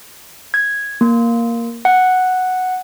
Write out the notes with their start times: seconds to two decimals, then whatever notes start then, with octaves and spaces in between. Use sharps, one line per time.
0.54 G#6
1.01 A#3
1.85 F#5